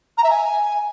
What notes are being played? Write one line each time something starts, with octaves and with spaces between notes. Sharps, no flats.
A#5
E5
G#5